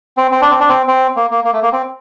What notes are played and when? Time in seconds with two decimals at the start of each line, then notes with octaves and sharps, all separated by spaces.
0.17 C4
0.32 C4
0.42 D4
0.50 C4
0.60 D4
0.69 C4
0.88 C4
1.16 A#3
1.31 A#3
1.44 A#3
1.53 A3
1.63 A#3
1.72 C4